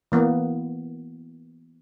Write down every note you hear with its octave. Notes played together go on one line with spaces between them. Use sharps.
E3 A#3 B3